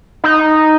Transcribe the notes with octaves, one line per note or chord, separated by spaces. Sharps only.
D#4